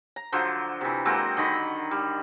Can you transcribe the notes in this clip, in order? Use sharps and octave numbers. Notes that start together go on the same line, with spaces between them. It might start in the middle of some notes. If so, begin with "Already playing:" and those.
A#5
D3 F3 F#3 C5
C3 E3
F#3 G#3 A#3 C4
D3 D#3 D#5 B5
G3